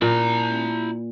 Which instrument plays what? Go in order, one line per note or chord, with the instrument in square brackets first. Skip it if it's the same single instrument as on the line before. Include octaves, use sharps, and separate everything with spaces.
[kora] A#2 [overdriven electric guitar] E4 A#5